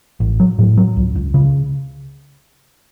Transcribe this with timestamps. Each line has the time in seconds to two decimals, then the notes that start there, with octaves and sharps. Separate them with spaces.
0.20 A1
0.40 F#3
0.59 A2
0.77 F#3
0.97 C#2
1.15 C#2
1.34 C#3